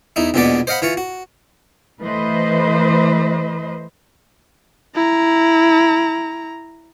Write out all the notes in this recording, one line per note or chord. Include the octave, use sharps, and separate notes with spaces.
E2 D#4 E4
A#1 E2 B2 G#3 B3 D5
C5 D#5 F5 F#5 B5
E3 F4 C#6
F#4
E3 A3 B4 C5 D#5
E4 A#5